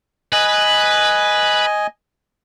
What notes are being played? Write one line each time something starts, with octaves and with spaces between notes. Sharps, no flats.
B4 D#5 G#5